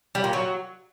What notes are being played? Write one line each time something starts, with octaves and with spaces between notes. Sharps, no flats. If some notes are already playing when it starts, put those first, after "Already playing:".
G3
A#2
F#3